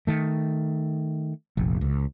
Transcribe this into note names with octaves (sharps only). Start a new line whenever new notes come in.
D#3 A3
F1 A#1
C#2